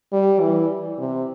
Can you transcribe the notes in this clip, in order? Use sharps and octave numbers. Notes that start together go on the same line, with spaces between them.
G3
E3
C3